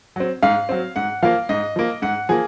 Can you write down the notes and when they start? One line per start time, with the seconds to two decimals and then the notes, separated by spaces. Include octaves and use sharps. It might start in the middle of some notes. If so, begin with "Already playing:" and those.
0.16 F#3 C4
0.43 G#2 F5
0.69 F#3 C4
0.96 G#2 F#5
1.23 F3 A#3 F5
1.49 G#2 D#5
1.76 F3 A#3
2.02 G#2 F#5
2.29 F3 A#3 G#4